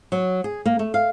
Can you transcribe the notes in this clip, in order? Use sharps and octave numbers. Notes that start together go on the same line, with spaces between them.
F#3
G#4
A#3
A3
F5